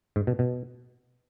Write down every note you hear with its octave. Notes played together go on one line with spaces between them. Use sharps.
G#2
B2
B2